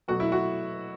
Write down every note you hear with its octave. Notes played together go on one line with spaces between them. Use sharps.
B2 F#3 A3 F#4
E4
F#4